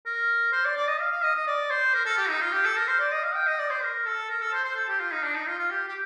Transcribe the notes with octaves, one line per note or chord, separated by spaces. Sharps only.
A#4
C5
D5
D5
D#5
F5
F5
D#5
D#5
D5
C5
A#4
A4
G4
D#4
F4
G4
A4
A#4
C5
D5
D#5
F5
G5
D#5
D5
C5
A#4
A4
A#4
A4
C5
C5
A4
G4
F4
D#4
D4
D#4
F4
F4
G4
G4